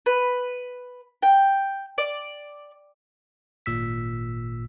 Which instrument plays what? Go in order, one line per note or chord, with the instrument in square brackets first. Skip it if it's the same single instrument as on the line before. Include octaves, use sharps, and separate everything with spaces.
[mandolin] B4
G5
D5
[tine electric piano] G#1 A#2 E6 B6